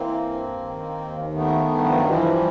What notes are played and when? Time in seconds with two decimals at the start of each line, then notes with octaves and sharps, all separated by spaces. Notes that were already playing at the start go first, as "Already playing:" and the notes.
Already playing: E3 A#3 C4
0.26 G2
0.62 D#3
0.98 D#2
1.34 D#3 A3 B3
1.71 G2
1.85 F3
1.95 F#3
2.06 E3 F3 G3